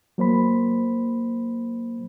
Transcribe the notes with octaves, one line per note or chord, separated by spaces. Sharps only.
F#3 A#3 C5 B5